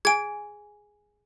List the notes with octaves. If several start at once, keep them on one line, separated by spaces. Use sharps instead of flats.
G#4 G#5 G#6 D7